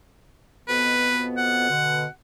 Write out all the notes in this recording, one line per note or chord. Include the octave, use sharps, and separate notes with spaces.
F2 B2 B3 B4
F#5
B2 D3